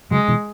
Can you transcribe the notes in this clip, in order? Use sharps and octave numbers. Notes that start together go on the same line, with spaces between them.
C#3 F#3 G#3
B2 E3